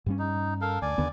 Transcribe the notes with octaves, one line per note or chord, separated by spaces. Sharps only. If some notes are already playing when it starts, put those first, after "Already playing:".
G2 G3 C#4
D#4
A4 A#4 F5
D2 D5 G#5
D#2 D3 B3